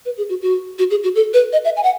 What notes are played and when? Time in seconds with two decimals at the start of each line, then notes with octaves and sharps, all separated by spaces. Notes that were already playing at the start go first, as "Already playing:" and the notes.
0.05 B4
0.17 G#4
0.29 F#4
0.42 F#4
0.79 F#4
0.91 G#4
1.03 F#4
1.15 A4
1.34 B4
1.53 D#5
1.65 E5
1.77 G#5
1.83 F#5